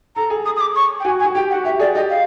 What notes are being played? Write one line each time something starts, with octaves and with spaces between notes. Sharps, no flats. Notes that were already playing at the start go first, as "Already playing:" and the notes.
A4 A#5
G#4
D#6
D#6
D6
C#6
G5
F#4 G#5
G#5
F#4
G4 G5
F#5
F#4
G4 E5
G#4 D5
G4 D#5
F5